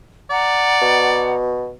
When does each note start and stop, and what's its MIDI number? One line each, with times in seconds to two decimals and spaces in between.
0.30 1.44 74
0.30 1.34 78
0.30 1.34 82
0.81 1.73 47